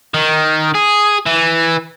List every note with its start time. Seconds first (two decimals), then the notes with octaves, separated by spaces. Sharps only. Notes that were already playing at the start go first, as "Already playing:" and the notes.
0.14 D#3
0.75 G#4
1.26 E3